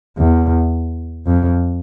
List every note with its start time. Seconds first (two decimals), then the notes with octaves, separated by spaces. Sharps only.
0.18 E2
1.26 F2